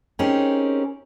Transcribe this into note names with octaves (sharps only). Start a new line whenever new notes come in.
C4 C#4 D#4 G4 G#4 A#4